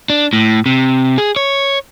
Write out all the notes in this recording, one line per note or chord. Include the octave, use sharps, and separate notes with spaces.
D4
A2
C3
G#4
C#5